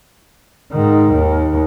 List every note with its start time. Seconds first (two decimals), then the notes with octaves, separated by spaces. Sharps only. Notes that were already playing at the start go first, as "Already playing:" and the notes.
0.72 G#2 D#3
1.14 D#2